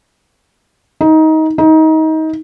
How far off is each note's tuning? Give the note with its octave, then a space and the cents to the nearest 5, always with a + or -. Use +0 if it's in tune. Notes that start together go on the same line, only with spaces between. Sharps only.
D#4 +20
D#4 +25